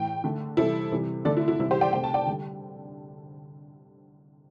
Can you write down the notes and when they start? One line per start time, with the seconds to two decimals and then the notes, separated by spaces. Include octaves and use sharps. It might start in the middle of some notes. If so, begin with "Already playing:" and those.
Already playing: A2 E3 G5
0.24 D3 A3
0.57 C3 E3 G3 E4 A4
0.92 C3 E3 G3
1.25 D3 A3 A4 D5
1.37 E4
1.48 E4
1.59 C3 E3 G3 E4
1.71 G4 C5
1.81 D5 G5
1.93 C3 A3 G5
2.04 A5
2.14 D5 G5
2.26 D3 G3